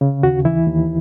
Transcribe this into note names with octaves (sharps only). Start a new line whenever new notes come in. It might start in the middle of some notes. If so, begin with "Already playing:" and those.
C#3
D#2 F#4
E3 E4
D#2